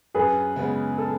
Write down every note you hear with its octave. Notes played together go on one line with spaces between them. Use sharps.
F#2 G#4 B4
C#3 G#3 B3
A4